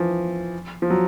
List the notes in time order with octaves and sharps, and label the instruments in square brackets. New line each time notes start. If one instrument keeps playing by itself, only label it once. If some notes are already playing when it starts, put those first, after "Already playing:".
Already playing: [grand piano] E3 F3
F3
F#3